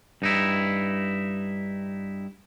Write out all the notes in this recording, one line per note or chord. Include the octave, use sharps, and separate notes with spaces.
G2 D#4 E4